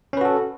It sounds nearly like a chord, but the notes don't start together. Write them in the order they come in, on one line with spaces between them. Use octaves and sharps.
C#4 B4 F#4 A4